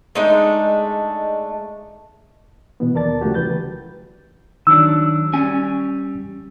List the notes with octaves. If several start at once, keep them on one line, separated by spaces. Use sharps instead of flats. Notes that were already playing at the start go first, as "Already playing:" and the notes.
G#3 A3 D4 D#4
B2 E3 B3
D#2 A#4 D5 A5 A6
C#3 F3 A3 F#4 G4
C#2 E3 B4 G6 A6
D#3 F#3 D4 E6
G3 C#4 G#5